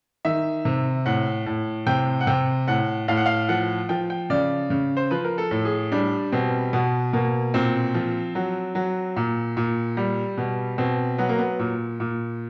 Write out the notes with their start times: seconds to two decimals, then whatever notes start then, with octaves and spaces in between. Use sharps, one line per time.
0.25 D#3 E5
0.65 C3
1.06 A2 F#5
1.46 A2
1.86 C3 G5
2.20 F#5
2.27 C3 G5
2.68 A2 F#5
3.08 A2 F5
3.17 F#5
3.26 F5
3.49 F3 F#5
3.89 F3 G5
4.10 G5
4.30 C#3 D5
4.70 C#3
4.97 C5
5.11 F3 B4
5.24 A#4
5.38 A4
5.51 A2
5.65 G#4
5.92 G3 D4
6.32 B2 C4
6.73 B2 B3
7.13 B2 A#3
7.54 A#2 C4
7.94 F3
8.35 F#3
8.75 F#3
9.16 A#2
9.57 A#2
9.97 G3
10.38 B2
10.78 B2 C4
11.18 F#3 B3
11.29 A#3
11.38 B3
11.59 A#2
12.00 A#2